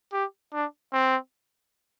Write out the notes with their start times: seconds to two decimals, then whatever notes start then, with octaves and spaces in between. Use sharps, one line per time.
0.13 G4
0.53 D4
0.93 C4